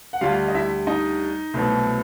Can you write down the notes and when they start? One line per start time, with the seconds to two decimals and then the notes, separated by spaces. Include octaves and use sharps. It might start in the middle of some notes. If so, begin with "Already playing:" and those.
0.13 F#5
0.21 D2 D3 G3 F4 F5
0.48 D#5
0.55 E4 E5
0.87 D#4 D#5
1.54 C2 B2 F#3 A3